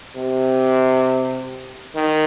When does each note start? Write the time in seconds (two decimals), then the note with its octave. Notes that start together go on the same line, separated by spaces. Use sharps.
0.16 C3
1.95 D#3